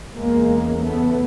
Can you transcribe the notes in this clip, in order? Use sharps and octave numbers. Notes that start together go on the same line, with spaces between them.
E2 C#3 G#3 A#3
A3 B3